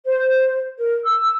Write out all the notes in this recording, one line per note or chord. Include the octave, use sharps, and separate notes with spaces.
C5
A#4
E6